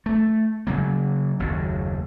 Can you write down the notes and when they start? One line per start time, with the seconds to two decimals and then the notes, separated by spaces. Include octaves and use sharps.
0.06 A3
0.67 C#3 F#3 A#3
1.39 F#1 D#2